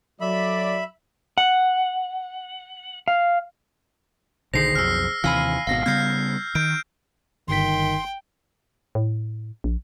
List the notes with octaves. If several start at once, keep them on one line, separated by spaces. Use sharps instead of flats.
F#3 A4 D5 E5 B5
F#5
F5
B1 D3 D#3 G#4 C5 A#6 C7
B1 F2 E6 F6
D#2 C3 E3 F5 G#5 B5 F6
G#1 B2 F5 A#6
C#3 G3 B3 F6 G6 G#6 C7
D#3 G6 D7
G1 D#3 G5 C6 B6
A2
A#1